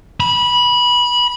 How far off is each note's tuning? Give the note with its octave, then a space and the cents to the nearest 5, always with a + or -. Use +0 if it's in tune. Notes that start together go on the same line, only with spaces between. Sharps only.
B5 -20